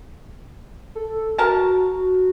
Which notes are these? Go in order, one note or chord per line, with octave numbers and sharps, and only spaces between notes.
A4
F#4 A#4 A5